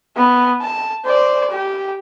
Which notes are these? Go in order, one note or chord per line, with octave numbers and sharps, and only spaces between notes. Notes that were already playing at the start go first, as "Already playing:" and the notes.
B3
A5
C5 D5
G4